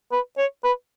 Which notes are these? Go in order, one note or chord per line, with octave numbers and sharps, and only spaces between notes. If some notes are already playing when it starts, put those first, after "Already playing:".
B4
C#5
B4